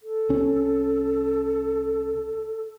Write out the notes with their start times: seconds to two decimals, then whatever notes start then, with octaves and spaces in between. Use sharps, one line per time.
0.03 A4
0.29 C2 C#4